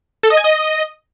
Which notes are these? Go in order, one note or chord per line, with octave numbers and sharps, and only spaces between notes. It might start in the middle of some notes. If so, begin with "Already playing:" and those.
A4
D#5
G#5
D#5